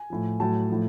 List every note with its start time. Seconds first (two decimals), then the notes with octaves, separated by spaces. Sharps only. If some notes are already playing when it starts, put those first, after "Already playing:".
Already playing: G#5
0.10 A2 F3
0.40 A2 F#3 A5
0.70 A2 F3